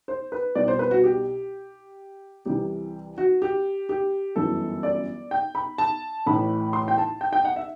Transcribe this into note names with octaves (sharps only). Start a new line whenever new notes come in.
C5
B4
C2 B2 D5
C5
B4
F#4
G4
C2 C3 E3 G4
F#4
G4
G4
G1 F#2 E3 A4
D5
G5
B5
A5
A1 A2 E3 B5
C6
G5
A5
G5
G5
F#5
E5